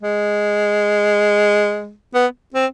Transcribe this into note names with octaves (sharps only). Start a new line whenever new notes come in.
G#3
B3
C4